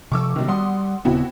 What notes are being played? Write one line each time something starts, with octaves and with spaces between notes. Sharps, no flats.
C3 F3 C#6 D6 E6
B1 C3 D#3
G3 F#5 C6 D#6
D#1 C#3 B3 C4 E4 F#4